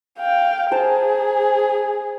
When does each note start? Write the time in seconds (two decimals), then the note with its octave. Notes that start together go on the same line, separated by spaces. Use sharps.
0.19 F5 G5
0.72 G#4 C5 A5 A#5